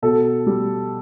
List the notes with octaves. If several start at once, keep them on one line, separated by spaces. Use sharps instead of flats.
B2 A4
G3